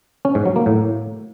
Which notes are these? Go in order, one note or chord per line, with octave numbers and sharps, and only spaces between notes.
C#4
G#2
F#3
A#3
A2